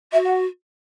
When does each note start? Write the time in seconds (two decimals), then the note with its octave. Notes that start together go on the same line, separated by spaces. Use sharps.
0.12 F#4 E5
0.25 F#5